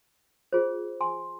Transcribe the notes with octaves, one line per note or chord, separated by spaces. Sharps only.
F4 G#4 C5
G#5 C6